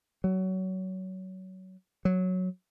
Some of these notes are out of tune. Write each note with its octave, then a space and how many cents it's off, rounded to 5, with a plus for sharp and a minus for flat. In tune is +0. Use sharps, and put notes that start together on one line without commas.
F#3 +20
F#3 -5